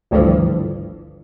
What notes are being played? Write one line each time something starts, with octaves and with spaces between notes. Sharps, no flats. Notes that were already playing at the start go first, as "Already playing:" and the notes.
G#1 D2 G2 D3 E3 F3